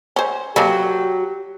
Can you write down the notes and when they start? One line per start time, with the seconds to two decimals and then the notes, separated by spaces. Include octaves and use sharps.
0.16 C#4 C5
0.56 F#3 A#3 C4 G4 A4